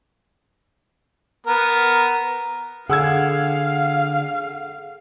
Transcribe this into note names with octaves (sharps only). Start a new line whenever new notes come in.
B3 A#4
D3 G#4 F5 F#5 E6 G#6